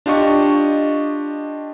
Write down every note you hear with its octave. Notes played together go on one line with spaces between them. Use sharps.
D4 F4 G4 D#5 C#6